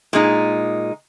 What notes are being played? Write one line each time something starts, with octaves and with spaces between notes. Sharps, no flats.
A#2 G#3 D#4